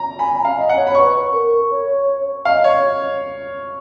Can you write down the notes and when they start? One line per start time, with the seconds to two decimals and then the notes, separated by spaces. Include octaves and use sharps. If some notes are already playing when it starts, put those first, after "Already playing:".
Already playing: A#5
0.19 G#5 B5
0.38 A#5
0.45 F5
0.57 D#5
0.69 F#5
0.76 C#5
0.87 B5
0.94 B4 C#5 C#6
1.32 A#4
1.70 C#5
2.45 D#5 F5
2.64 C#5